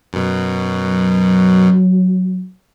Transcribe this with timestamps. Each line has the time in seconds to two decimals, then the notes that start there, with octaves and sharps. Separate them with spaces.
0.13 F#2 B2
0.81 F#3